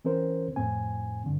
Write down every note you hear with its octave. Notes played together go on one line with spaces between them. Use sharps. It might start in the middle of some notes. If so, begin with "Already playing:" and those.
E3 C4 C#4 A#4 C5
F2 A2 C4 G#5
G2 D3